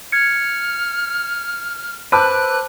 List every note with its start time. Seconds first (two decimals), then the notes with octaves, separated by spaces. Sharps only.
0.12 F6 G#6 C#7
2.12 B4 C5 A5 D6 E6 F#6